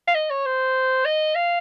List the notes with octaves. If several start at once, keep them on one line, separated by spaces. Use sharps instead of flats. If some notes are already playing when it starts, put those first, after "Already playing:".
F5
D#5
C#5
C5
D#5
F5